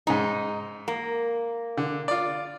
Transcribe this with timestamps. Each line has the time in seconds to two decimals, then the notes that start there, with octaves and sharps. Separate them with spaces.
0.07 G#2 C#3 D#4
0.88 A#3
1.77 D3
2.08 F4 D5